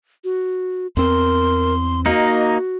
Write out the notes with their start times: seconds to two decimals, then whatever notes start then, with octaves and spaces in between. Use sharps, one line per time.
0.24 F#4
0.97 E2 C4 A#4 C6
2.06 A#3 D#4 F#4 D#5